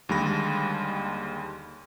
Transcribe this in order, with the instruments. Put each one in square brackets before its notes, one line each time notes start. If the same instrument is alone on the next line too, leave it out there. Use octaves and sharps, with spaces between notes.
[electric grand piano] D#2 D3 G3 G#3 B5 A#6